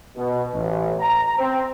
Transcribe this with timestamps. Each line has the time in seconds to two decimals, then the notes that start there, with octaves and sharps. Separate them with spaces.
0.17 B2
0.54 A1
1.00 A#5
1.38 C4